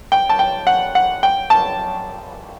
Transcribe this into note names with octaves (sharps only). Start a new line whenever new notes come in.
G5
A5
G5
F#5
F#5
G5
A5